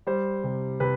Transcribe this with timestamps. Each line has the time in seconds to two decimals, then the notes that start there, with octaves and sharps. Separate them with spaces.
0.07 G3 C5
0.44 C3
0.80 C3 B4